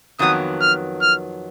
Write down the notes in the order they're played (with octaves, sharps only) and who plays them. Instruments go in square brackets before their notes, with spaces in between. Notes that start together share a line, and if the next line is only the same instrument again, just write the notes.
[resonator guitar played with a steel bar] F2 D#3 F#3 B3 [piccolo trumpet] D#6
[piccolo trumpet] F6
F6